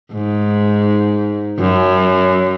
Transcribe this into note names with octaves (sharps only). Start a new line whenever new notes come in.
G#2
F#2